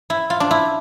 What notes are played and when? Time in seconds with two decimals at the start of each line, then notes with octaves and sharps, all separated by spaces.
0.10 E4
0.30 F4
0.40 D4
0.51 E4